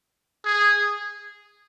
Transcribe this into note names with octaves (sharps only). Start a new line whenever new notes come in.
G#4